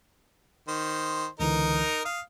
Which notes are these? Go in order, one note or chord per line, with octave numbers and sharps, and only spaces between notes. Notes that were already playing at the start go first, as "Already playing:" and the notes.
D#3 C5
C#2 D3 E3 D#4 A#4
F5 D#6